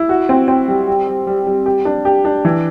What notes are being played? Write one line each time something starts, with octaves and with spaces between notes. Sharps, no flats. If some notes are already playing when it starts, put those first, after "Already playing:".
Already playing: E4
F#4
C4
C4
G3
G3
G3
G3
G3
G4
D4
G4
D4
E3